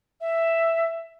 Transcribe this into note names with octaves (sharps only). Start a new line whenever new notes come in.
E5